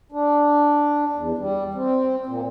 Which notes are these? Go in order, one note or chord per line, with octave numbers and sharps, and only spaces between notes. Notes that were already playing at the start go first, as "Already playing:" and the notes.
D4
E2
G3
C4
A#2